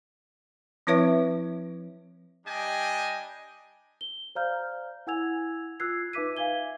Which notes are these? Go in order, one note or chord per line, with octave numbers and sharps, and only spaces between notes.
F3 C4 E4 B4 C#5 E5
G3 D4 G4 D#5 G5 G#5
G7
C5 D5 F5 A#5 F6 G6
E4 F#5 G#5 E6 G#6 F7
F4 E6 F#6 G#6 C7
D#4 B4 E5 D6 B6 D#7
E5 F5 G#5 G#6 G7